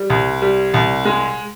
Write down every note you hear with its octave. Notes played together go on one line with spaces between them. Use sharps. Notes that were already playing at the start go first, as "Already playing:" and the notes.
Already playing: G3
C2
G3
C2
G#3